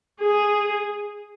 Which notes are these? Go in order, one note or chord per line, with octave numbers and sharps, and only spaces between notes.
G#4